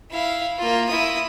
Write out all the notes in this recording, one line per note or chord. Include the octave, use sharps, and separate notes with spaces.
E4 F5
A#3 F4
E4 D#6